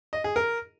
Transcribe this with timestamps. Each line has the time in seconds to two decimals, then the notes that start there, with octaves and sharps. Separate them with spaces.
0.13 D#5
0.24 G#4
0.36 A#4